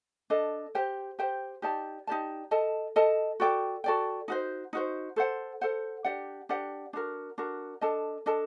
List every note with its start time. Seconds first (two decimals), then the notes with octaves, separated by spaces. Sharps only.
0.30 D4 A4 D#5
0.75 G4 C5 G5
1.19 G4 C5 G5
1.62 D#4 G4 D5 A5
2.07 D#4 G4 D5 A5
2.51 A4 D#5 A5
2.96 A4 D#5 A5
3.40 F#4 A4 D5 G5
3.84 F#4 A4 D5 G5
4.28 D#4 F#4 C5
4.73 D#4 F#4 C5
5.16 A4 C5 F#5
5.61 A4 C5 F#5
6.05 D4 G4 D5 F#5
6.49 D4 G4 D5 F#5
6.93 D4 F#4 A#4
7.38 D4 F#4 A#4
7.81 D4 A4 D#5 A5
8.26 D4 A4 D#5 A5